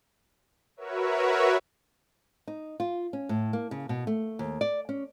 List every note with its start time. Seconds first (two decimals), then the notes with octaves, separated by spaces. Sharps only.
0.77 F#4 A#4 B4 C#5 E5
2.47 D#4
2.80 F4
3.13 C#4
3.29 A2
3.53 A#3
3.71 C#3
3.89 B2
4.07 A3
4.39 D#2
4.61 D5
4.89 C#4